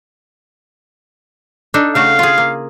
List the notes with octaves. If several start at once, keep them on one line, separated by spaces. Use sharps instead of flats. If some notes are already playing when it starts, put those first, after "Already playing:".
D4 D#4 A4
C#3 A3 F#4 F5
F4 G#4
A#3